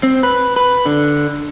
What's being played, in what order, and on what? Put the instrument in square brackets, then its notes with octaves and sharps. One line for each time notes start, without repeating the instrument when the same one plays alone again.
[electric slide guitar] C4
B4
B4
D3